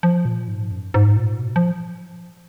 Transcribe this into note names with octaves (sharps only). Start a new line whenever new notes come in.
F3
A#2
G#2
F#2
G#2
A#2
B2
F3